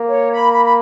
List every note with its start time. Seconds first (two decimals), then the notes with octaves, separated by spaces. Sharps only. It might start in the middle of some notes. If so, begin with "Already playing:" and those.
Already playing: A#3
0.09 C#5
0.31 B5
0.53 B5
0.65 B5